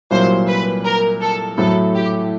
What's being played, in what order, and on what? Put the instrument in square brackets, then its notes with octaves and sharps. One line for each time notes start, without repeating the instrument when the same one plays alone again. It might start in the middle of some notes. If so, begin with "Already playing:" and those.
[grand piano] C2 A#2 F#3 [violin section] C5
[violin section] B4
A#4
A4
[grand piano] A2 F#3 A3 [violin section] A4
[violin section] G4